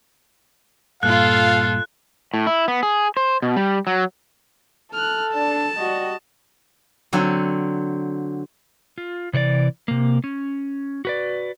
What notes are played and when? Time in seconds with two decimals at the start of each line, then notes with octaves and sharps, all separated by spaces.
1.03 G2 A#2 F4 A4 F5 F#6
2.34 A2
2.47 E4
2.68 B3
2.83 G#4
3.17 C5
3.42 B2
3.56 G3
3.87 F#3
4.94 A4 F6 F#6
5.34 D4 A5
5.78 G3 F#4 D#5
7.13 D3 F#3 C4
8.98 F4
9.33 C3 E3 C#5 D5
9.88 C3 A#3
10.24 C#4
11.05 F#4 B4 D5